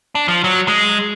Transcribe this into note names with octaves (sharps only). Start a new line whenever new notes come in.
D4
F3
F#3
G#3